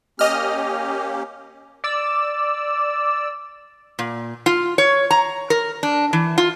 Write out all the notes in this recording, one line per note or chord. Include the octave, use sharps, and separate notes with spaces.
A#3 C#4 G4 D#5 F6
D5 E6
A#2
F4
C#5
A#5
A#4
D4
E3
F4